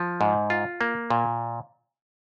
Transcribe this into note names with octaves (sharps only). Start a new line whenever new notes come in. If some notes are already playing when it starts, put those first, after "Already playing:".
Already playing: F3
G#2
F4
A#3
A#2